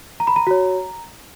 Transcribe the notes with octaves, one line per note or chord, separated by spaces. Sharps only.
A#5
B5
A#5
F#4 C#5